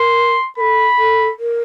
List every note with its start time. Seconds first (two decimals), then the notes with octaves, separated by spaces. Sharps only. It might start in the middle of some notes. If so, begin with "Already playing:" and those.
Already playing: A#4 C6
0.57 A4 A#4 B5
0.98 A4
1.39 A#4